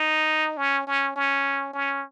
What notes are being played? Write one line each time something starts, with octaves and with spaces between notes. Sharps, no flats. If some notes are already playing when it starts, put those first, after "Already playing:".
Already playing: D#4
C#4
C#4
C#4
C#4